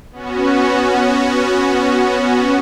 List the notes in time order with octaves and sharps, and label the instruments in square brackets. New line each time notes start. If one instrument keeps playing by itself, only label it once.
[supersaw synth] B3 C#4 F#4